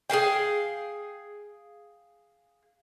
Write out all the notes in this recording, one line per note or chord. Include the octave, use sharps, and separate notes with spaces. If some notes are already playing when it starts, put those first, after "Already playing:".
G#4 A4 F5 G5